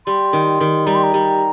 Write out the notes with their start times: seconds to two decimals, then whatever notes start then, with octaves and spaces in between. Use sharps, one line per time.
0.07 G3 C6
0.33 D#3
0.61 D#3
0.86 G3 A#5
0.95 C6
1.03 A#5
1.14 G3